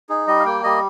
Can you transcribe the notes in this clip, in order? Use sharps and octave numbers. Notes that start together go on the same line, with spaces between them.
D#4 G#4
G3 D#5
F5
A#3 G5
G3 D#5